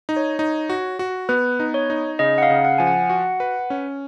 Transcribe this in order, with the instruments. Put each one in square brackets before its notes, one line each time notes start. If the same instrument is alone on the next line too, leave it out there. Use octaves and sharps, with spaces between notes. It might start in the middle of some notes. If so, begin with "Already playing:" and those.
[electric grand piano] D#4
[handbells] C#5
[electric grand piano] D#4
F#4
F#4
[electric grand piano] B3 [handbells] B4
[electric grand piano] D#4
[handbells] C#5
[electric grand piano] D#4
[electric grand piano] C#3 [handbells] D#5
[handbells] F#5
F5
[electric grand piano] C#3
[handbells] F#5
[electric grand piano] F3 [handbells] G#5
[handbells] F#5
[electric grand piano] F#4 [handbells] F#5
[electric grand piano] B4
C#4